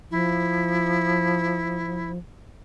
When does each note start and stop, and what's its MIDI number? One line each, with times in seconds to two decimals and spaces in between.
0.11 2.18 53
0.11 2.12 64